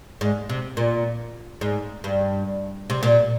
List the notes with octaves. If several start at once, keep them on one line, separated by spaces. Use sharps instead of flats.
G#2
C3
A#2
G#2
G2
C3
A#2